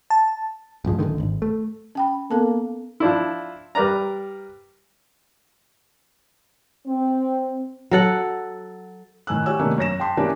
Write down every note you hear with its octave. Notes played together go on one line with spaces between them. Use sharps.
A5
A1 G2 F3 G#3
D1 A1 D3 D#3
G#1
A3
C#4 G5 B5
A#3 B3 A4 A5
F3 D4 E4
G3 A#4 B4 D5 A#5
C4
F#3 A4 F#5
A2 D#3 G#5 E6 F#6
F#4 G4 C#5 G#5 E6 F#6
C3 D#3 A3 A#3 C#4 D4
F#2 C#5 A#6 E7
G5 A5 C6 B6
E3 A#3 C#4 D4 G4 A#4